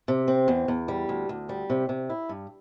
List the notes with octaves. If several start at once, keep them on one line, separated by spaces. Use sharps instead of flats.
C3
C4
E2
E2
G3
D2
D2
G3
C3
C3
E4
G2